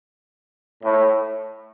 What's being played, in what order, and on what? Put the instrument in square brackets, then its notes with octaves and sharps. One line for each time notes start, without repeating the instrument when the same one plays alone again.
[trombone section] A2